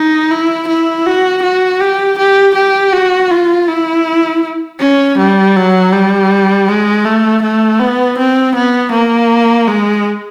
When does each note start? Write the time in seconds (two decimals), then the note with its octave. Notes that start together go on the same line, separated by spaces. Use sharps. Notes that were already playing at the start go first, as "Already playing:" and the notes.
Already playing: D#4
0.31 E4
0.68 E4
1.06 F#4
1.43 F#4
1.81 G4
2.19 G4
2.55 G4
2.93 F#4
3.31 F4
3.68 E4
4.80 C#4
5.18 G3
5.56 F#3
5.93 G3
6.68 G#3
7.05 A3
7.43 A3
7.80 B3
8.18 C4
8.55 B3
8.92 A#3
9.68 G#3